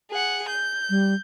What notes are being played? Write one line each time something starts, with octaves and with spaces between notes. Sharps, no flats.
G#4 F#5
G6
G3